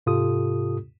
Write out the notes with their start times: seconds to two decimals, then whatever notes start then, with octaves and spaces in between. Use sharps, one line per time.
0.06 G#2 C3 F4 G4 A4 D#6